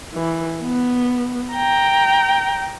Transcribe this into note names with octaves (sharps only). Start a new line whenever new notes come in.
E3
B3
G5 A#5